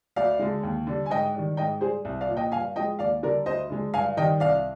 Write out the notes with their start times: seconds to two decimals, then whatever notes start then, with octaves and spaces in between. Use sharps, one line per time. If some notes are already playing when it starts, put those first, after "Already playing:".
0.16 D2 D5 F5
0.39 D3 G#3
0.63 D#2
0.87 D3 G3
1.06 G#5
1.10 G#2 D#5 G5
1.35 D#3 G3
1.57 G#2 D#5 G5
1.81 G3 G#4 C5
2.05 C2
2.21 D5 F5
2.28 A#2 F3
2.37 D#5 G5
2.52 G2 F5 G#5
2.76 F3 G#3 D#5 G5
2.99 D#2 D5 F5
3.23 D3 G3 A#4 D5
3.46 D2 C5 D#5
3.70 D3 G#3
3.94 G2 F5 G#5
4.17 D#3 G3 D#5 G5
4.40 C2 D5 F5